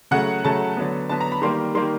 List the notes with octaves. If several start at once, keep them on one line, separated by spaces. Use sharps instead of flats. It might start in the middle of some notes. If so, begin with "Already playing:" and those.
C#3 F#3 A3 F#5
C#3 F#3 A3 A5
D3 F#3 B3
D3 F#3 B3 A5
A#5
B5
D#3 G3 A#3 C6
D#3 G3 A#3 C6